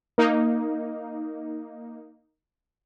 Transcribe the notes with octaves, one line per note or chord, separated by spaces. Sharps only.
A#3 D#4